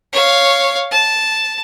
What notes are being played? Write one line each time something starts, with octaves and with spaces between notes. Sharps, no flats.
C#5 F5
A5